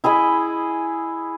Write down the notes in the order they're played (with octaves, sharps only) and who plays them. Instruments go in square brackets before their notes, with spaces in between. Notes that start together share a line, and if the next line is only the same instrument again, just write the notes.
[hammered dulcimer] E4 G#4 D#5 B5